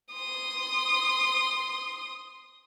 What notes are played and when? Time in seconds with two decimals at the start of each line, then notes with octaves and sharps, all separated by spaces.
0.13 C6 D#6